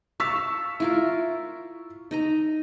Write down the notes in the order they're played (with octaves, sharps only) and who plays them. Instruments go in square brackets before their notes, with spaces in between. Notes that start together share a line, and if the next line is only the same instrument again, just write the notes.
[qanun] F5 A5 [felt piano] C#6 E6 B6
[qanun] E4 F4 A#4
D#4 D#5 A#5